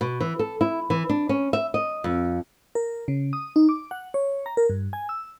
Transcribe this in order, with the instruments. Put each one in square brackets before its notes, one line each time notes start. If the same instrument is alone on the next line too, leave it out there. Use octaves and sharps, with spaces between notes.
[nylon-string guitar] B2
E3
A4
E4
E3
D4
C#4
E5
D#5
F2
[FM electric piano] A#4
C#3
D#6
D#4
D6
F#5
C#5
A#5
A#4
G2
G#5
E6